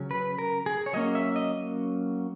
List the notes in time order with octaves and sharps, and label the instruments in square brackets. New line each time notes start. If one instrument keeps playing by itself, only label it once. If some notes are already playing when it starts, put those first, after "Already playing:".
Already playing: [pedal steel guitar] C#3 F#3 C#4
B4
A#4
G#4
C#5
F#3 A#3 C#4 D#5
E5
D#5